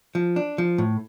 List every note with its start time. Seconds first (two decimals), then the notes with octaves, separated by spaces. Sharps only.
0.15 F3
0.36 D4
0.58 F3
0.78 A2